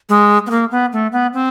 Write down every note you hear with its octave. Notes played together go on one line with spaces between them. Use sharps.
G#3
B3
A#3
B3
A3
B3
C4